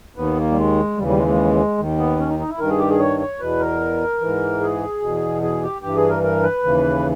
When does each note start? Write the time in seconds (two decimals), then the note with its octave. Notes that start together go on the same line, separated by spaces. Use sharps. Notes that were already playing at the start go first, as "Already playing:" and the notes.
0.16 D#2 D#3 B3
0.37 A#3
0.52 G3
0.56 G#3
0.98 D#2 C#3 E3 G3
1.08 G3
1.17 G#3
1.28 G#3
1.78 D#2 D#3
1.98 B3
2.19 C#4
2.29 D#4
2.39 D#4
2.49 E4
2.59 G2 D#3 A#4
2.69 G#4
2.79 G4
2.89 G#4
3.00 C#5
3.20 C#5
3.39 E2 B2 B4
3.60 A#4
4.20 G#2 E3
4.61 G#4
5.02 E2 B2
5.42 G#4
5.63 G4
5.82 G2 E3 G4
5.96 G#4
6.10 A#4
6.23 A#4
6.43 B4
6.64 D#2 C#3 E3